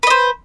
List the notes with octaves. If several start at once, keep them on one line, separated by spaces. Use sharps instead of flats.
B4 C5 D#5